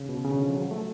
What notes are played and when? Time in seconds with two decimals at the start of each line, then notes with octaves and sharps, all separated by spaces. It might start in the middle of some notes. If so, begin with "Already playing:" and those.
Already playing: C#3
0.09 B2
0.24 C#3
0.35 D3
0.45 F3
0.55 F#3
0.71 A3